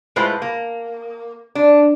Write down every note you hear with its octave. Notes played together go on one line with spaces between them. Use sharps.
A2 G#3 F4 B4 C5
A#3
D4